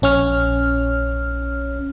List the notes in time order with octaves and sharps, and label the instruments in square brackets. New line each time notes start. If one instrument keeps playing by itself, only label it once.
[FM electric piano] A#1 C#4 C#5 F6